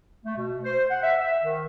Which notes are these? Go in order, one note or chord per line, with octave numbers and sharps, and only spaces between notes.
A3
B2
C5
F#5
E5
E5
D#3